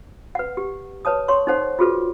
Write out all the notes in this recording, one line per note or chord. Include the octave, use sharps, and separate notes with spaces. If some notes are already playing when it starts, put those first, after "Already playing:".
B4 F#5
G4
B4 C#5 A5 D#6
C#5 C6 C#6
D#4 A4 C5 F#5
F4 F#4 G#4 A4 B4